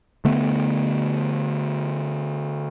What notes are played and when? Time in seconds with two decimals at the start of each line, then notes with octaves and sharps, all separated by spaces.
0.25 D3 A3 B3